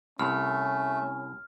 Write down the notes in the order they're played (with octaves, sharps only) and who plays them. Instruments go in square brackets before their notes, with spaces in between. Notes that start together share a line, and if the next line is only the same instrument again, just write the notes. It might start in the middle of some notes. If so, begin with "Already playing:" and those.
[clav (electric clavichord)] C2 [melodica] A3 [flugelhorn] C#4 [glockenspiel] F6